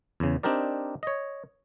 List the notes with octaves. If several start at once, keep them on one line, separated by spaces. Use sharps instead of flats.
E2 C#3
C4 D4 D#4 G4 A#4 D5
C#5 D#5